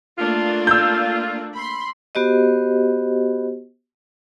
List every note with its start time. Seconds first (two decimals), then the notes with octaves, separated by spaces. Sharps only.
0.18 A3 A#3 D4 F4
0.67 E6 G6
1.54 B5 C6
2.15 B3 F#4 G4 C5 D#5